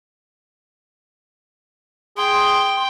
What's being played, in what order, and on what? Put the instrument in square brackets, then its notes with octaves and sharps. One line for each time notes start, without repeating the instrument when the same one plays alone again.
[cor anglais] G#4 [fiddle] G5 [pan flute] C6